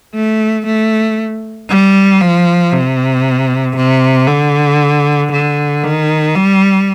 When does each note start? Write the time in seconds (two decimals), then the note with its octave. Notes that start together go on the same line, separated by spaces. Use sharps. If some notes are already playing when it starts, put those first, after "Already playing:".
0.14 A3
0.66 A3
1.69 G3
2.21 F3
2.73 C3
3.76 C3
4.28 D3
5.31 D3
5.83 D#3
6.35 G3